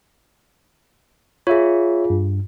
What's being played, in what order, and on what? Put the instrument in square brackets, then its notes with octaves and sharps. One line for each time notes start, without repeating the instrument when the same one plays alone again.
[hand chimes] F4 G#4 [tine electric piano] C#5 E5
[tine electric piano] G2